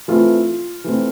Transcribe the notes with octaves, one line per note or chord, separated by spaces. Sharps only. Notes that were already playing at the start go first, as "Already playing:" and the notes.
E3 A3 C4 F4
E3 A3 C4